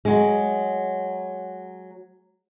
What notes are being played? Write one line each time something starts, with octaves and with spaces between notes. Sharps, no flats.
F#3 G#3